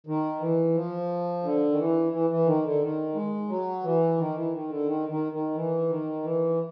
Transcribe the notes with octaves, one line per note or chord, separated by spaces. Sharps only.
D#3
E3
F3
D3
D#3
E3
E3
E3
D#3
D3
D#3
G#3
F#3
E3
D#3
E3
D#3
D3
D#3
D#3
D#3
E3
D#3
E3